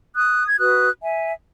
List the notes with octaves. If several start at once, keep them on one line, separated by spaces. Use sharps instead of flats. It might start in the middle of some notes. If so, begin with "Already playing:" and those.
D#6 F#6
G#6
F#4 B4 D#6 F#6
E5 G#5